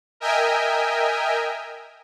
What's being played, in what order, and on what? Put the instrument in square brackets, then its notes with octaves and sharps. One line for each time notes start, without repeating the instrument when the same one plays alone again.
[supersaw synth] A#4 D#5 E5 G5 G#5